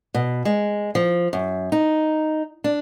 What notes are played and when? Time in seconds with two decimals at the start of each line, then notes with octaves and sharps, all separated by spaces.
0.14 B2
0.45 G#3
0.95 F3
1.33 F#2
1.72 D#4
2.64 D4